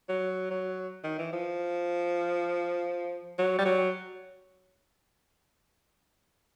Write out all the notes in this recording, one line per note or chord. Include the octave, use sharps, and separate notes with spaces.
F#3
F#3
D#3
E3
F3
F#3
G3
F#3